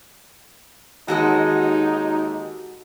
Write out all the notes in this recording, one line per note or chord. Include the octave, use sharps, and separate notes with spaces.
D#2 G#3 D#4 F#4 A4 D#5